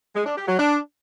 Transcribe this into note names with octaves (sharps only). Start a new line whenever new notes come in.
G#3
D4
G4
F#3
D4